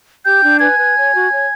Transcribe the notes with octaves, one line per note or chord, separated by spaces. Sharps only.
G4 G5 G6
D4
B4 G#5 G#6
B4
C#5
F#4
C#5